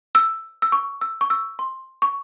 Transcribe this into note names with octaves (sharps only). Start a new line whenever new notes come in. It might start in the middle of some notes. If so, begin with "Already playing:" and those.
E6
E6
C#6
E6
C#6
E6
C6
C#6